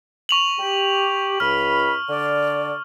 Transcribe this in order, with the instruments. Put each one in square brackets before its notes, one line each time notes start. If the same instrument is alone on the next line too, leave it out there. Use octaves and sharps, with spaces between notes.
[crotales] C#6 F7 F#7
[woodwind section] G4
[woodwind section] C#2 B5 [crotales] F6
[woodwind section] D3 D5